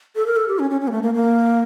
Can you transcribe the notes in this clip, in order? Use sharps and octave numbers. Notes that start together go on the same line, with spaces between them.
A4
A#4
A4
G4
C#4
C#4
C#4
A#3
A3
A#3
A#3